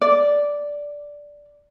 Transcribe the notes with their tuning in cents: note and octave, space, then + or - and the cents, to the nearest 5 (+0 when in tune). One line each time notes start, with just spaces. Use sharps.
D5 -5